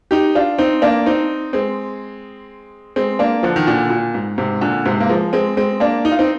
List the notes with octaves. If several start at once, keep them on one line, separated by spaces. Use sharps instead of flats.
D#4 G4
D4 F4
C4 D#4
A#3 D4
C4 D#4
G#3 C4
G#3 C4
A#3 D4
D3 F3
D#3
A#2 D3
A#2
G#2
G#2 C3
A#2 D3
G#2 C3
A#3
F3 G#3
G#3 C4
G#3 C4
A#3 D4
D#4
F4
C4 D#4